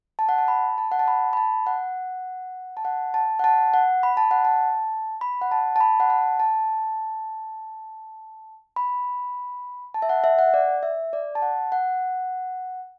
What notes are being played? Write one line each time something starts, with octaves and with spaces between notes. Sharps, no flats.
A5
F#5
A5
B5
A5
F#5
A5
B5
B5
A5
F#5
A5
F#5
A5
F#5
A5
F#5
B5
A5
F#5
A5
B5
F#5
A5
A5
B5
F#5
A5
A5
B5
A5
E5
F#5
E5
F#5
D5
E5
D5
A5
F#5
F#5